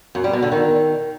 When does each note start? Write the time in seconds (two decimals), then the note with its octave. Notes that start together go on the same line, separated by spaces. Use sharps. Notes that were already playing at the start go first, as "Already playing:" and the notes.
0.15 F#2
0.24 G3
0.33 B2
0.42 D3
0.52 D#3